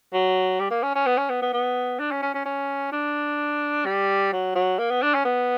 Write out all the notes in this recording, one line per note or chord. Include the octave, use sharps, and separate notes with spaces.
F#3
G3
A#3
C#4
C#4
B3
C#4
B3
B3
B3
D4
C#4
C#4
C#4
C#4
D4
G3
F#3
F#3
A#3
B3
D4
C#4
B3